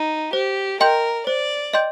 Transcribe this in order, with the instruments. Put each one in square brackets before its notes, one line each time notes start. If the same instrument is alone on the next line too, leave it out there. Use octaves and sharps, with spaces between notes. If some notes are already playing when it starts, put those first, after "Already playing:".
Already playing: [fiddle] D#4
[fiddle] G4 [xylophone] C5
[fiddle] A#4 [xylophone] D#5 G5 C6 G6
[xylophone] C5 [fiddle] D5
[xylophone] D#5 G5 C6 G6